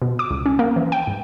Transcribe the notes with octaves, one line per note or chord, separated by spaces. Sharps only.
B2
D6
C#2
C#4
A#3
E3
G5
G#2